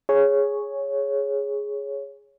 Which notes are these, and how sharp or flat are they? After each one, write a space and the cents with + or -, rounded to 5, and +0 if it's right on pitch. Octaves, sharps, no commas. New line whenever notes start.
G#4 +0 C#5 +0